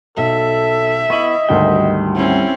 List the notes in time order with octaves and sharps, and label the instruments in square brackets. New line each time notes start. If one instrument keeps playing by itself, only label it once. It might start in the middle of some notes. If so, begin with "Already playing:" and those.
[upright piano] B1 [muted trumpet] A4 [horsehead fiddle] E5
[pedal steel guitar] B3 E4 [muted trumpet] D#5 [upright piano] C#6 D#7 F#7
[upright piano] G#1 D2 D#3 [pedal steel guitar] G3 G5
[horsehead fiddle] C4 C#4 [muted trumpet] E4